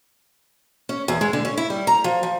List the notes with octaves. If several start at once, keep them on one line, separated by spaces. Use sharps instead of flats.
C#4
E2
G#3
D3
C#4
E4
G3
A#5
F3
F3